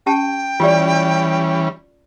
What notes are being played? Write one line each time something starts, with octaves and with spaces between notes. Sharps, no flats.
C#4 G4 G5 A5
E3 G3 C#4 F4 G4 D5